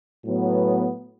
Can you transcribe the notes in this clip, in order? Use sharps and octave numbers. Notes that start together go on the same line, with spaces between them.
A2 F#3 B3